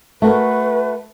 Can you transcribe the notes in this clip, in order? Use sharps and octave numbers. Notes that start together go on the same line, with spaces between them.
A3 F#4 A#4 B4